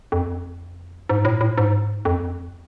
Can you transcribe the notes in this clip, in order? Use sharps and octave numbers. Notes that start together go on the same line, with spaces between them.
F2
G#2
A2
A2
G#2
F2